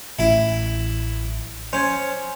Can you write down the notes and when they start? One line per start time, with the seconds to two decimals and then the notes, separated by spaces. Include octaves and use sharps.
0.19 A1 E4
1.73 C#4 C5 G#5